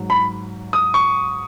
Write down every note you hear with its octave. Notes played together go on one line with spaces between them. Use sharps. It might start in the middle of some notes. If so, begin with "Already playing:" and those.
Already playing: G#2 F#3
B5
D#6
C#6